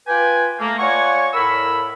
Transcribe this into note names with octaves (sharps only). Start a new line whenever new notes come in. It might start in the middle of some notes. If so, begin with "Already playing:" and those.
F4 B4 G5 G#5
A3 A#3
F4 C#5 D5 F#5 G#5 C#6
A2 A#4 B5 E6